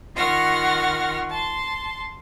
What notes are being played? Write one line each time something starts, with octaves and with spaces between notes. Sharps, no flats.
D#3 F4 F#5 C#6 F6 A#6
A5 C6